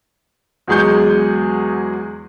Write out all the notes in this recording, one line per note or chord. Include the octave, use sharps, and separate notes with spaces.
E2 F#3 G#3 G#4 C#6 G6